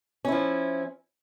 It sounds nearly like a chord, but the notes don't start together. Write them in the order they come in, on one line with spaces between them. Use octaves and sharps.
C#4 E4 F3